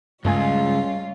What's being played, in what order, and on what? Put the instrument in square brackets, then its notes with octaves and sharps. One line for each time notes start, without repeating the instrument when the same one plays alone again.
[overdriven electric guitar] C#2 [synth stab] G2 A3 G#5 [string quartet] G3 F4 C#5